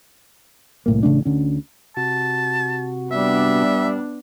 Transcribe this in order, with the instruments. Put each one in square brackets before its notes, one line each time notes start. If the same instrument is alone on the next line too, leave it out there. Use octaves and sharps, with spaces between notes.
[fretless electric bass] C2 A2 A#3
A1 C#3 A3 D4
D2 D3 C#4
[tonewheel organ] C3 F#4 [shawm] A5
[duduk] G3 [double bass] B3 D4 [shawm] E5